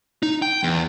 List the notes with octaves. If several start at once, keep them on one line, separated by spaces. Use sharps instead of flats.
D#4
G5
E2